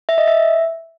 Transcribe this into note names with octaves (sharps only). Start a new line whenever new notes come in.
E5
D#5
E5